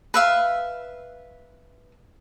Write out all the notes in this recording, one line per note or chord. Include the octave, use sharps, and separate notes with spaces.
B4 E5 F5